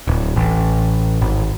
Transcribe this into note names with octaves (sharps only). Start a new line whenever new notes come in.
D1
A1
G#1